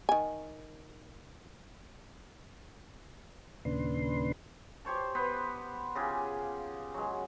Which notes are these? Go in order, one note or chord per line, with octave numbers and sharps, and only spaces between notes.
D#3 G#5
D#2 A#2 C#3 D4 B4 C6
G4 C5 C#5 A5
B3 B4 C5
C#3 F4 G4 G#4
F#3 G#3